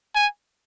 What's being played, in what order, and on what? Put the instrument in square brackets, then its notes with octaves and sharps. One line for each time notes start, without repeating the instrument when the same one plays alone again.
[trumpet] G#5